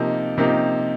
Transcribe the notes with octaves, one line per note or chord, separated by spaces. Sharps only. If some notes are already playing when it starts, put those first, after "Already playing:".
Already playing: C3 F3 A#3 D#4 G4
C3 F3 A#3 D#4 G4